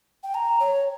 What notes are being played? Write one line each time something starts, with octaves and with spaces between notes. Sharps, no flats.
G5
A#5
C#5